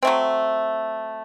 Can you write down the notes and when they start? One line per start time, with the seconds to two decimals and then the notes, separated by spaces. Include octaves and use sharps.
0.03 F#3 A3 C4